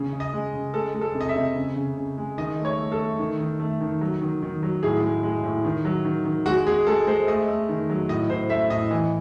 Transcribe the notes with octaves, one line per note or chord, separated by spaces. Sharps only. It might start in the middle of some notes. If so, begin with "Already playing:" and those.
Already playing: C#3
C#3
D#5
G#3
C#3
G#3 A4
G#3
A4
C3
D#5
E5
C3
C#3
C#3
C#3
G#3
D#3 D#5
A3
C#5
A3
A4
A3
D#3
D#3
A3
D#3
F#3
D#3
D#3
F#3
A2 G#4
G#3
G#3
A2
D#3
F#3
D#3
D#3
G#3 F#4
G#3 G#4
G#3 A4
G#3 C5
A3 D#5
A3
D#3
F#3
A2 D#5
A2 C5
A3 E5
A2 D#5
E3 D#5